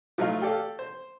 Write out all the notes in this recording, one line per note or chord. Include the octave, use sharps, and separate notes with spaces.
F3 F#3 A3 D#4 F4
G4 A4 D5 F5
C5